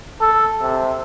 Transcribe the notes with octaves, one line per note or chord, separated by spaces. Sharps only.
A4
C3